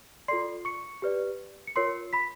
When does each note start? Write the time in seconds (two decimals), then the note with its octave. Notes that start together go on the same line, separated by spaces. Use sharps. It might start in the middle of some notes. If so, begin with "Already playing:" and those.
0.28 F4 A4 D5 C6 C7
0.65 C#6 C#7
1.02 G4 B4 D5
1.67 C#7
1.76 F4 A#4 C#5 C6 C7
2.13 B5 B6